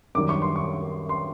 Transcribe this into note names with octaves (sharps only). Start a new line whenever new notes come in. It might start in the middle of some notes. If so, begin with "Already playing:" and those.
F#2 D#3 G3 D6
C#6
C6
C#6
C6